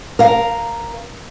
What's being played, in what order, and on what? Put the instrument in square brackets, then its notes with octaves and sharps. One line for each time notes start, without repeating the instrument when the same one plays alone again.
[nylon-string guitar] A#4 F5